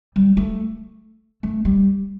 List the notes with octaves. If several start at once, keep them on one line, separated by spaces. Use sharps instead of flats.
G3
A3
A3
G3